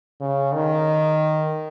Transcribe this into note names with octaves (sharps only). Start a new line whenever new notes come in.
C#3
D#3